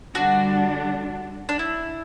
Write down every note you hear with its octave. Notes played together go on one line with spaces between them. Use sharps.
D3 G3 D4 F#4
D4
E4